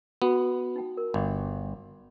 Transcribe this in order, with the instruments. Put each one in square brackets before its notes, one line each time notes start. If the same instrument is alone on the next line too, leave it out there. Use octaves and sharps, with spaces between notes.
[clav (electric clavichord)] B3 [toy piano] F#4 F#5
[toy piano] D#4 G5
A#4
[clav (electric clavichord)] G1